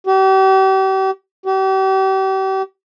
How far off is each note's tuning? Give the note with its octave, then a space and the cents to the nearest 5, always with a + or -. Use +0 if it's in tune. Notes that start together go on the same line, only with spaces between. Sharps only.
G4 -40
G4 -40